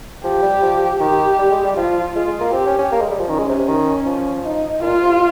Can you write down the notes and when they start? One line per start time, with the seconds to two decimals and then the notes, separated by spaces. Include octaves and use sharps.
0.24 F3 G4
0.42 G3
0.62 F3
1.00 D#3 G4
1.38 G3
1.51 G#3
1.64 G3
1.76 F3 F4
2.15 G#3 F4
2.27 G#3
2.40 A#3
2.53 C4 G4
2.66 C#4
2.78 C#4
2.92 A#3
3.01 G#3
3.10 G3
3.19 F3
3.29 D#3 C#4
3.39 G#3
3.49 C3
3.59 C3
3.68 D#3
4.06 F3
4.45 D#4
4.82 A#2 F4
5.01 C3